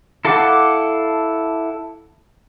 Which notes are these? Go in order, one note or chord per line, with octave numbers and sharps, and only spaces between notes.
E4 A4 F5 F#5 D6